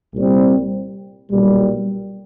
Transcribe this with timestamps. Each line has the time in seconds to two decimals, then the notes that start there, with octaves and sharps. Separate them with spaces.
0.13 C2 A#2 G3 C4
1.31 B1 A#2 G3